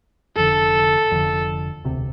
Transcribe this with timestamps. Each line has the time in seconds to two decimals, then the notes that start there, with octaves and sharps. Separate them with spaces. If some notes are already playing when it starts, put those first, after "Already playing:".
0.36 F1 F2 D3 A4
1.11 F1 F2 D3
1.84 E1 D2 C3